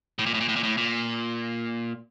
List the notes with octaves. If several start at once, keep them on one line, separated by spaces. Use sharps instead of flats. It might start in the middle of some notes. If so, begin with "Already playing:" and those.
A2
A#2
A2
A#2
A2
A#2
A2
A#2